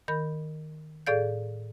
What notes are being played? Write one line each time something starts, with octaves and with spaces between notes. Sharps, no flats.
D#3 A#4 B5 G6
A2 G#4 A4 D5 F5 G6